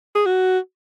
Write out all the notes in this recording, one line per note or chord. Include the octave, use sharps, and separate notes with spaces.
G#4
F#4